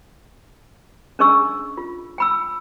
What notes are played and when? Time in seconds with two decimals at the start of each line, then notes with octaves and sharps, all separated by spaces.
1.19 C#4 D4 G#4 D#5 C#6 E6
1.77 F4
2.18 G5 B5 E6